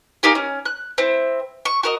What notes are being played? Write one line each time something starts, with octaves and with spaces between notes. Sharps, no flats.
A#3 D#4 G4 G#5
C#4
F#6
C4 E4
C#6
F#4 A#4 D#5